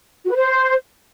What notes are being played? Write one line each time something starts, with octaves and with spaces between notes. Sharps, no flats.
F#4
B4
C5